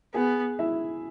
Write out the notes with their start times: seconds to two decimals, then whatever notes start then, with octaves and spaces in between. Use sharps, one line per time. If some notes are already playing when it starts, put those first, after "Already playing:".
0.14 B3 G#4
0.59 E4 E5